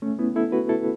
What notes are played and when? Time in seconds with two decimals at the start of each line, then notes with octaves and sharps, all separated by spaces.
0.02 A3 C#4
0.19 B3 E4
0.36 E4 A4
0.52 F#4 B4
0.69 E4 A4